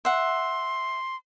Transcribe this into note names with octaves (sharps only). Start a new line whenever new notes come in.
E5 F#5 C6